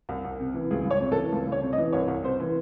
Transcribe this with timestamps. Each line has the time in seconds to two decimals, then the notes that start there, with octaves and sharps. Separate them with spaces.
0.09 C2
0.24 C2
0.40 C3
0.54 E3
0.71 C#2 G#4
0.85 C#2
0.91 C#5
1.00 C3
1.12 A4
1.16 E3
1.32 C#2
1.47 C#2
1.52 C#5
1.62 C3
1.73 D#5
1.78 E3
1.93 C2 C#5
2.08 C2
2.24 C3 C5
2.40 E3